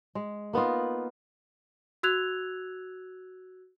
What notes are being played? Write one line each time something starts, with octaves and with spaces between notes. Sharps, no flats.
G#3
A#3 B3 D#4 F4
F#4 E6 F#6 G#6 F7